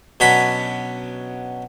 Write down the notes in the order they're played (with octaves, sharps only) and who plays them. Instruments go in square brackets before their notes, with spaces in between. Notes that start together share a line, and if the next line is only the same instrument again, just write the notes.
[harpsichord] B2 F#3 C#4 D4 B5